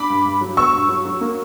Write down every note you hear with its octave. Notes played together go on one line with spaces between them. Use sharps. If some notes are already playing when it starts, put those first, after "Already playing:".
Already playing: D4 B5 D6
G2
G2
F#3
B3 C#6 E6
G2
F#3
F#3
A#3